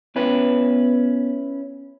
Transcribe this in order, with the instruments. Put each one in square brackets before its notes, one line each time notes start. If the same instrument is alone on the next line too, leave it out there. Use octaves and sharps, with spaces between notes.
[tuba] B3 [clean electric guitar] C#4 E4 B4